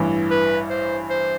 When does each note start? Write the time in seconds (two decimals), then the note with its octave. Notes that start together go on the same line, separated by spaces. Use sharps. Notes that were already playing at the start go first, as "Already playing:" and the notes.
Already playing: A1 G2 E3
0.31 B4
0.70 C5
1.10 C5